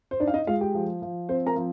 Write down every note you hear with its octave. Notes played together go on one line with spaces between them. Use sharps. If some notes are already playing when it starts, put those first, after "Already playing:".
C5
D4 D#4 D5
F5
D#4 D#5
G#3 F4 F5
G4 G5
F3
F3
C4 C5
A#4 A#5
F3